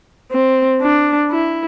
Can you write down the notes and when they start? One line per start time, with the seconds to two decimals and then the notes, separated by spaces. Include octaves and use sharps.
0.31 C4
0.81 D4
1.31 E4